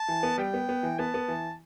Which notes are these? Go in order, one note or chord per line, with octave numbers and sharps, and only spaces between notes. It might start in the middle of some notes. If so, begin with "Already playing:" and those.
Already playing: A5
E3
B3
G3 G5
B3
B3
E3
B3 A5
B3
E3